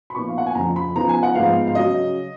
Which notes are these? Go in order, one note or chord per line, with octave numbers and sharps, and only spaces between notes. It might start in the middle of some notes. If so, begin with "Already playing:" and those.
B5
A#2 F3 B3 D#4 C#6
F5
F#5
G#5
F2 C#3 F3 A#5
B5
C#3 F3 B3 D#4 A#5
G#5
F#5
G#2 F3 B3 F5
F5
C#3 F#3 C#4 D#5